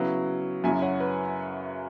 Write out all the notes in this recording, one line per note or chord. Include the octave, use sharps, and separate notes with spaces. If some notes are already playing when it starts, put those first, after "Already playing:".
Already playing: C#3 F#3 B3 E4
F#2 C#3 F#3 E4 E5 G#5
C#5 F#5
B4